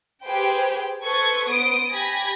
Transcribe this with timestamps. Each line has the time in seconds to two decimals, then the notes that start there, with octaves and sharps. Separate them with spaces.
0.23 G4 G#4 B4 C5 G5
1.03 A4 B4 C5 C#6 G#6
1.48 B3 C5 D#6 D7
1.92 G4 G#5 B5 G#6 A#6 B6